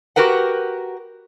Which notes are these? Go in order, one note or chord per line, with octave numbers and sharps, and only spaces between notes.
F#4 G4 A#4 B4 F#5